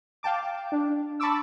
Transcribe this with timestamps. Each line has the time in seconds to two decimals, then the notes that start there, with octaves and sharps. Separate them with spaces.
0.23 F5 G5 A5 D6
0.72 D4
1.20 A5 B5 C#6 D6 E6